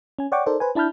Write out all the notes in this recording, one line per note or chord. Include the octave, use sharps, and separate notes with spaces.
C#4 G#5
C#5 D5 F#5 G5 C#6 D6
D#4 A4 A#4 C5 D5
B4 C5 G#5
D4 E4 A5 B5 F6 G6